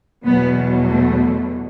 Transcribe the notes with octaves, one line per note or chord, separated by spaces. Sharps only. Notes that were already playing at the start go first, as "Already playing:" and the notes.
E2 B2 F#3 B3
A3